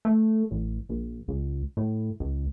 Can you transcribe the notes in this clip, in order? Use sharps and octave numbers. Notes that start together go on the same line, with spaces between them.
A3
A1
A#1
C#2
A2
C#2